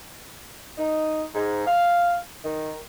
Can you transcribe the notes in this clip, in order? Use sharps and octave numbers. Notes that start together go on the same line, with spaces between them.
D#4
G#2
F5
D#3